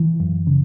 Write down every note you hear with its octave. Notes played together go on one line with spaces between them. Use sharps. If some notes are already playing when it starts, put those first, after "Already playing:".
Already playing: E3
F#2
C#3